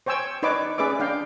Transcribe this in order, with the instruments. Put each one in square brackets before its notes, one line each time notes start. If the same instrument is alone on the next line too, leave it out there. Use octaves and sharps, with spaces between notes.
[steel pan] C5 C#5 G5 G#5 E6
D#4 B4 C#5 D5 D6
C#4 G#4 B4 D5 E5 D6
D4 F5 G5